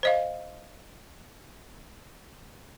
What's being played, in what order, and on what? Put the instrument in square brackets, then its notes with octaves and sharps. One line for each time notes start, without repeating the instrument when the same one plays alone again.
[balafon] C5 D#5 F5